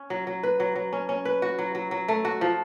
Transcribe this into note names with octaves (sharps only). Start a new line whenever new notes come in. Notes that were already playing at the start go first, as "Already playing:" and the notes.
Already playing: C#4
F#3
F#3
B4
F#3
F#3
C#4
C#4
B4
F#4
F#3
F#3
F#3
A3
F#4
F3